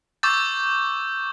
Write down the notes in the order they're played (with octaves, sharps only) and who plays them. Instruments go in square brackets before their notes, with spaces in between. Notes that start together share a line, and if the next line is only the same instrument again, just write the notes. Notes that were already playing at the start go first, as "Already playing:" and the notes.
[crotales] C#6 D6 E6 G6 A6